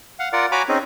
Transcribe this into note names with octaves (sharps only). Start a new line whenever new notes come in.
F5 F#5
F4 A#4 D5 F#5
F#4 C#5 G#5 A#5 B5 D6
C4 C#4 D#4 G#4